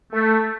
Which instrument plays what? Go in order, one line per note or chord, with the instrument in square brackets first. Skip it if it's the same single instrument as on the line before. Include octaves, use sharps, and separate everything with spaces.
[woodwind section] A3